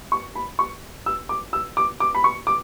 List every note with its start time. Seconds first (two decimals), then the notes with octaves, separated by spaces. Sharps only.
0.12 C#6
0.35 B5
0.59 C#6
1.06 E6
1.29 D6
1.53 E6
1.77 D6
2.00 D6
2.15 B5
2.24 C#6
2.47 D6